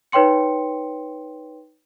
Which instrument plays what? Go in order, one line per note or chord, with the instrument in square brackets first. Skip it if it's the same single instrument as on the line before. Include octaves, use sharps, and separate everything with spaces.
[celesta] D#4 B4 C#5 G5 C6 C#7